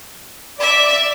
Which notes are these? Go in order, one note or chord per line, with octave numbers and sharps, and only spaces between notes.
D5 E5